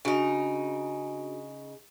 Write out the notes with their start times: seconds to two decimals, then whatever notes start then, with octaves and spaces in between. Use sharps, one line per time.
0.05 C#3 D4 D#4 F#4 D7